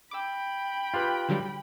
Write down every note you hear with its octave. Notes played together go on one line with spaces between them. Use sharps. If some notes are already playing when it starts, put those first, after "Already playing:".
G5 B5 D6 E6
F4 G4 B4
D3 F#3 G3